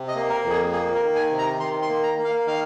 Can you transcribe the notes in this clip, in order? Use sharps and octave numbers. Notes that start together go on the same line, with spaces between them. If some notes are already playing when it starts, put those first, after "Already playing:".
Already playing: C3
D#5
A#3
A#4
F2
G#4
A#3 G#4
A#4
D#3
G#5
C3
A#5
D#3 C6
C6
A#3
A#5
A#3
F5
D#3 F5